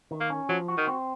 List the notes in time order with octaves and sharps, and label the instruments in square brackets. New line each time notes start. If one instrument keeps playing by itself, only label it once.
[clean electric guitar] D#3
[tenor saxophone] A#3
[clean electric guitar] C#4
[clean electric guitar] F3 [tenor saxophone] F#3
[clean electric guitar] F#4
[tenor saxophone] D#3
[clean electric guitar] C4